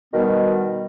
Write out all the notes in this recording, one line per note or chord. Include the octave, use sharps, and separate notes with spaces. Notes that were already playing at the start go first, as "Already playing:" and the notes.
B2 D#3 G3 B3